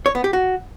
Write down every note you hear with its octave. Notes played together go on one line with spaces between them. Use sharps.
C#5
B3
G4
F#4